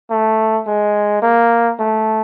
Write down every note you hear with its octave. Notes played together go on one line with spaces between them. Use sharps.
A3
G#3
A#3
A3